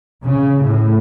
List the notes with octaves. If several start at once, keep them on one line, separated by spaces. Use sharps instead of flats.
C#3
A2